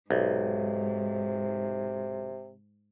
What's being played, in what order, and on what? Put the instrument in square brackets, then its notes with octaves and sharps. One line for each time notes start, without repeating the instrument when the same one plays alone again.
[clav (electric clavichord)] B1 [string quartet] G#2 [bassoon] C3